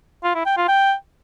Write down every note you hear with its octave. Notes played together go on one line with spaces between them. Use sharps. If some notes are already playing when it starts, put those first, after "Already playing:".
F4
E4
G5
F4
G5